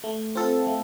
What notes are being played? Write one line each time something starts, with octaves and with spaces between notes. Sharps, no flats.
A3
C4 F4 A4
A3